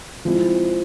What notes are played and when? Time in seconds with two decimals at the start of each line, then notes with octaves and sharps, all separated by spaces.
0.25 F3 G#3 C4 E4